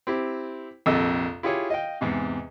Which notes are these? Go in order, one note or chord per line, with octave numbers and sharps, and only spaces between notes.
C4 E4 G4
A#1 F2 C3 A4 D#5 E6
E4 F4 G4 G#4 C#5
D#5 F5 G5
E2 G#2 C3